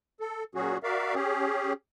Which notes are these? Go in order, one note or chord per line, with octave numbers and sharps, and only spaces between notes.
A4
A#2 F#3 C#4 F#4 G#4
F#4 A#4 D5 E5 F5
C#4 G4 G#4